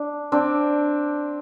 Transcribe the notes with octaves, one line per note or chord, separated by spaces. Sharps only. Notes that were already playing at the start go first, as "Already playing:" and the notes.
Already playing: D4
C4 D4